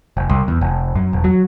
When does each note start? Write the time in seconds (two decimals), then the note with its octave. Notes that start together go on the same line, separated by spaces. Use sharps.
0.17 F1
0.29 C2
0.48 E2
0.61 F1
0.96 F#2
1.13 E1
1.24 F#3